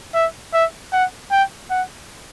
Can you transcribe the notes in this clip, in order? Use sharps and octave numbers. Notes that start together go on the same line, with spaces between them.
E5
E5
F#5
G5
F#5